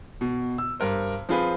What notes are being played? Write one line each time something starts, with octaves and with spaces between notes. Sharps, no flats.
B2
E6
G2 A#4 C5
F3 C4 F4 G#4 B4